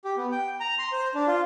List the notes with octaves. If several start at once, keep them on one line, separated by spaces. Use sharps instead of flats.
G4
B3
G5
A#5
C6
C5
D4
F4